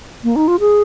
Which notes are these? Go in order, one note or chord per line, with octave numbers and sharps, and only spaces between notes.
A#3
D#4
F4
G#4